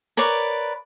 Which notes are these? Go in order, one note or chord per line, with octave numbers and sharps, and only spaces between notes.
A#4 B4 C#5 D5